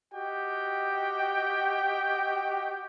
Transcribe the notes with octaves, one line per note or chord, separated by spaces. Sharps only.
F#4 G4 D#5 G5